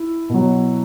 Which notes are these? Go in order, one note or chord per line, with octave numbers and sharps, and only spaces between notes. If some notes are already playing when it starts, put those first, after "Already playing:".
Already playing: E4
B2 F#3